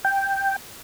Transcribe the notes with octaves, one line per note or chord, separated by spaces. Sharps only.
G5